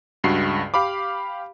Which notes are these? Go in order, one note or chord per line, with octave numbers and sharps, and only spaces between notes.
C#2 G2 F#4 C7
G4 F5 B5 D6